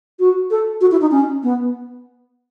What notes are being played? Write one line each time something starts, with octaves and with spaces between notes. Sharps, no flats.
F#4
A4
F#4
E4
D#4
C#4
B3